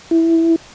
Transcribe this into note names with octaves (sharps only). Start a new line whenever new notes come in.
E4